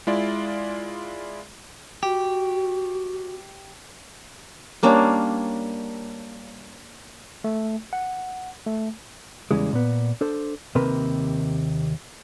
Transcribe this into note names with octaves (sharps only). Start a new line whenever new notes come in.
G#3 E4 F4 D5
F#4 G4
G3 A#3 C#4 D4
A3
F#5
A3
E2 C#3 E3 G3 G#3
A#2 B3
D4 A4 C5
D#2 C3 A#3 A#4 B4 C6